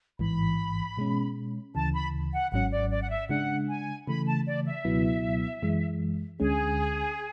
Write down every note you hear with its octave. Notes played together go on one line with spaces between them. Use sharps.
A1 G#2 E3 B5
B2 G#3 C#4
D2 C#3 E3 A5
B5
F#5
G#1 G#2 F#3 C#4 F#5
D5
D5
F#5
E5
C#3 G#3 D4 F#5
G#5
C#3 E3 A3 B5
A5
D5
E5
C#2 B2 F#3 B3 E4
F#2 E3 G#3
D2 D3 G#3 C#4 G#4